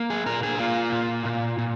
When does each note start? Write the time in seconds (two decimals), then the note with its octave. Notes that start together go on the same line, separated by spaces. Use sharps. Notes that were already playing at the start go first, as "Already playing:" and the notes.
Already playing: A#3
0.10 G#4
0.26 A#2 A#4
0.43 G#4
0.59 A#3 F4
0.92 A#2
1.25 A#2
1.58 A#2